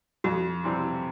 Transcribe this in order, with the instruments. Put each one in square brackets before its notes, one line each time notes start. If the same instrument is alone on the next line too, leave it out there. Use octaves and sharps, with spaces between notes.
[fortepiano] F2 [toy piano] F#4
[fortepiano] C3 E3 G3 C4